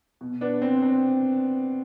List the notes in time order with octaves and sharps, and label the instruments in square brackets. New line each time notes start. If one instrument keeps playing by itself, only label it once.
[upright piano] B2
B3 D4
C4
C4